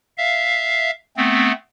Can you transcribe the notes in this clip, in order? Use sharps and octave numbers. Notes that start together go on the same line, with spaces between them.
E5 F5
A3 B3 C4